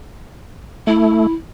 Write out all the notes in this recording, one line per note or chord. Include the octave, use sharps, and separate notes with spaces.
A3 E4